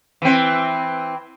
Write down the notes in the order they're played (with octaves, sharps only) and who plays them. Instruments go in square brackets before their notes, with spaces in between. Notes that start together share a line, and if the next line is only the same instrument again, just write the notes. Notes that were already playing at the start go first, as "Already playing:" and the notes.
[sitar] E3 C4